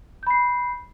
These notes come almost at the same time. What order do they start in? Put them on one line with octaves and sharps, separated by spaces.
G6 B5 C7